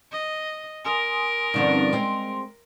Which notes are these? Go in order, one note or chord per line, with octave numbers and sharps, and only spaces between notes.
D#5
A#4 G#5 C6 D#6
G2 D3 F3 C4 C#4 D#4
G#3 C4 C6